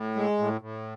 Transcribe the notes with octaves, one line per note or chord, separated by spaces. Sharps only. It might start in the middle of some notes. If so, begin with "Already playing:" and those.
Already playing: A2
G#3
A2
A2